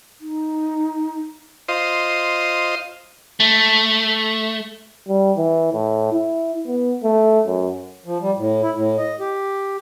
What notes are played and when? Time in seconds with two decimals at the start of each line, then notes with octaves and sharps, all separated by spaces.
0.21 D#4
1.69 F4 C5 D#5
3.40 A3
5.08 G3
5.37 E3
5.73 A2
6.12 E4
6.67 B3
7.04 A3
7.47 F#2
8.06 F3
8.21 G3
8.37 A2
8.62 E4
8.74 A2
8.98 D#5
9.20 G4